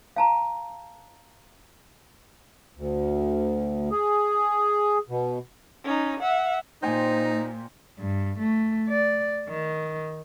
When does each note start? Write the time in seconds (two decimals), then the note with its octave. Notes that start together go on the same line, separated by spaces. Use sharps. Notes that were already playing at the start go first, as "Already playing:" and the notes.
0.16 F5 A5 A#5
2.77 D2
3.91 G#4
5.09 B2
5.84 C#4 D#4
6.20 E5 F#5
6.82 A#2 D#4 C5 G5 G#5
7.99 G2
8.39 A3
8.89 D5
9.49 D#3